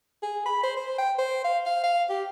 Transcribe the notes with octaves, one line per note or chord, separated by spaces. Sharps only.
G#4
B5
C5
C5
G5
C5
F5
F5
F5
G4